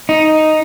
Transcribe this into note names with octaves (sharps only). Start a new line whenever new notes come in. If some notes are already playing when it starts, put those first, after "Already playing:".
D#4